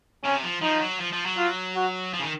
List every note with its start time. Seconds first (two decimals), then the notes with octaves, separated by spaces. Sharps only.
0.24 C3 C#4
0.44 F3
0.62 F3 D#4
0.82 F#3
1.00 F3
1.13 F3
1.26 F#3
1.38 F4
1.76 F#4
2.14 F3
2.19 C#3
2.23 D#3